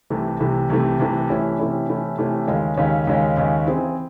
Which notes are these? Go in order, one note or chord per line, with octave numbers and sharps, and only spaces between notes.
C2 C3 E3 A3
C2 C3 E3 A3
C2 C3 E3 A3
C2 C3 E3 A3
C3 E3 A3 C#4 E4
C3 E3 A3 C#4 E4
C3 E3 A3 C#4 E4
C3 E3 A3 C#4 E4
D#2 C#3 G#3 C#4
D#2 C#3 G#3 C#4
D#2 C#3 G#3 C#4
D#2 C#3 G#3 C#4
E3 C4 E4 G#4 C5